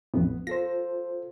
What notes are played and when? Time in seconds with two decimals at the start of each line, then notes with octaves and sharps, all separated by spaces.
0.14 A#1 F2 A2 B3
0.47 F4 A4 C5 A#6